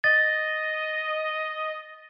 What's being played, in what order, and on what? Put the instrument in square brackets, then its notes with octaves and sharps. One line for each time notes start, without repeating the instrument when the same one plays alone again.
[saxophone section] D#5 [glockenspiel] A6